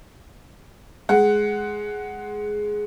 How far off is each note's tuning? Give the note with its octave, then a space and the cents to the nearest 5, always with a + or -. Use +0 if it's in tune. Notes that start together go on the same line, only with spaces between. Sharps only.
G#3 +10 F#5 +5